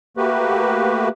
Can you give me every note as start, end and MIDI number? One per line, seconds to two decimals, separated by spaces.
0.17 1.09 57
0.17 1.09 58
0.17 1.09 66
0.17 1.09 67
0.17 1.09 71